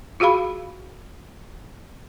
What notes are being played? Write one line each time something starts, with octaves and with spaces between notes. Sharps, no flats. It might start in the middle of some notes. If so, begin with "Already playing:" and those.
F4 F#4 G#4 F5 B5